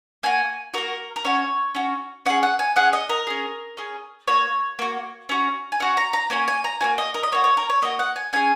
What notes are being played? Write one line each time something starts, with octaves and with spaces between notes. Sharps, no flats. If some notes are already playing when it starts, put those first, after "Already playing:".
A#3 F#4 G#5
A#3 F#4 A#4
A#4
C#4 F#4 C#5
C#4 F#4
C#4 G#4 F#5
F#5
G#5
C#4 G#4 F#5
D#5
A#4
C#4 G#4
C#4 G#4
A#3 F#4 C#5
A#3 F#4
C#4 F#4
G#5
C#4 F#4 F#5
A#5
A#5
A#3 C#4 F#4 G#5
G#5
A#5
A#3 C#4 F#4 G#5
D#5
A#4
D#5
A#3 F#4 C#5
C#5
A#4
C#5
A#3 F#4 D#5
F#5
G#5
C#4 G#4 G#5